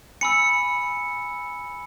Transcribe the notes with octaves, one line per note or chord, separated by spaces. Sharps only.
G#5 B5 E6 C#7